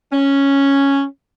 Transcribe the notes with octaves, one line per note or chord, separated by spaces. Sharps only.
C#4